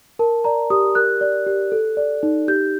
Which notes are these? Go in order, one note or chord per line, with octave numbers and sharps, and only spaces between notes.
A#4 A5
D5 A#5
G4 D#6
A#4 F#6
D5
G4
A4
D5
D#4
G4 G6